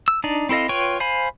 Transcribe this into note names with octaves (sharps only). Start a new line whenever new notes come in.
E6
D4 D#4 D5
C4 E4 A4 D#5 F5
F4 B4 C#5 G5 C#6
C5 F5 G#5 B5